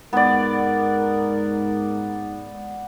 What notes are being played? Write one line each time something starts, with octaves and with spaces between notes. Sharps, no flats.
G#2 B3 A#4 D5